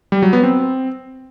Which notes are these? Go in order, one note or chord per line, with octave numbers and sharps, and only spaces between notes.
G3
F#3
B3
C4